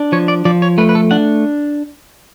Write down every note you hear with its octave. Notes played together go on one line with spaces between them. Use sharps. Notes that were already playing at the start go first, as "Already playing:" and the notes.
Already playing: D4
F3 C#5
D5
F3 D5
C#5
A3 B4
B4
A4
D4 F#5